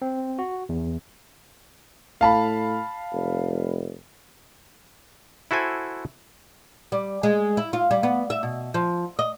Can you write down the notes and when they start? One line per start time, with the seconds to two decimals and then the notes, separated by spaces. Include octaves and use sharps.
0.02 C4
0.39 F#4
0.69 E2
2.21 A2 F5 A5 B5
3.13 F1
5.51 E4 F#4 A4 C5 G#5
6.92 G3
7.23 G#3
7.57 E4
7.73 F4
7.91 G3
8.03 B3
8.30 E5
8.43 B2
8.74 F3
9.19 D#5